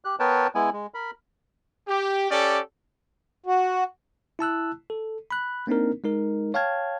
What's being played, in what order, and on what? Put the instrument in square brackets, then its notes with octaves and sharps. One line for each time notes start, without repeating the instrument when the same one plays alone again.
[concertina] G4 F#6
B3 A#4 B4 C#5 G5 A5
G#3 B3 E4 G#5
G#3
A#4 B5
[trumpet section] G4
C#4 G4 A4 D5
[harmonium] F#4
[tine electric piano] E4 A5 E6 F#6
A4
B5 F#6
A#3 C4 D4 D#4 A#4
G#3 D#4 A#4
C#5 F5 G5 A5 F6 G#6